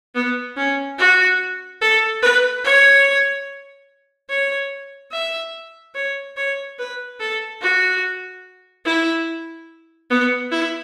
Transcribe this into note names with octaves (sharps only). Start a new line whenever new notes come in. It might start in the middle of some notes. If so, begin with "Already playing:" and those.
B3
C#4
F#4
A4
B4
C#5
C#5
E5
C#5
C#5
B4
A4
F#4
E4
B3
E4